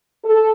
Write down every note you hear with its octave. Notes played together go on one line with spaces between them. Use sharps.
A4